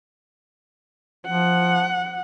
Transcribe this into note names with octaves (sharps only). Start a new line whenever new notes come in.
F3 F#5